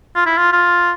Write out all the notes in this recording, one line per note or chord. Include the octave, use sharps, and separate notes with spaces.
F4
E4
F4
F4